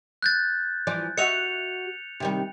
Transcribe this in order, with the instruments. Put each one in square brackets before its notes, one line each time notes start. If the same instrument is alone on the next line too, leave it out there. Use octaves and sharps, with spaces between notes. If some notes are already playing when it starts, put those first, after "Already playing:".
[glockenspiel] F#6 G6 A6
[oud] E3 F3 D5
[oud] F#4 D#5 E5 [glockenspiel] C#7 F7
[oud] C3 D#3 G3